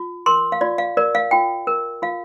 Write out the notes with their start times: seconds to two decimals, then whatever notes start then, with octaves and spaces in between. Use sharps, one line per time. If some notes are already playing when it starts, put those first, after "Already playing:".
Already playing: F4
0.26 A#4 C6
0.52 F5
0.61 F4 D5
0.78 F5
0.97 A#4 D5
1.15 F5
1.31 F4 G5
1.67 A#4
2.02 F4 F5